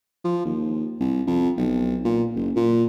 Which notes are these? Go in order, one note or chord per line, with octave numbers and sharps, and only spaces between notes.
F3
D#2
C2
F2
B1
A#2
F#1
A#2